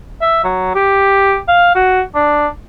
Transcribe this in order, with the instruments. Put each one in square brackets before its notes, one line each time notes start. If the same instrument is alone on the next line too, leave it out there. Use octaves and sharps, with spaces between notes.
[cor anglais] E5
F#3
G4
F5
F#4
D4